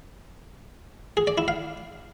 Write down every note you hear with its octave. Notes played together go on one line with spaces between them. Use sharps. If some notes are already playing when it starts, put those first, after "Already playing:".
G#4
D5
E4
F5